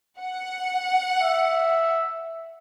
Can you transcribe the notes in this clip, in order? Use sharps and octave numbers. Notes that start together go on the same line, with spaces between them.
F#5
E5